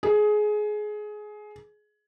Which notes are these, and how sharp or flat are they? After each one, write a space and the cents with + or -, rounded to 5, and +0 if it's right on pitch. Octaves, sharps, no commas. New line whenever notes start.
G#4 +20